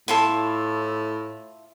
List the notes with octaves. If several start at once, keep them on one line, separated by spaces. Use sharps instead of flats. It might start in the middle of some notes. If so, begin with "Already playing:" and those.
A2 E4 F4 A4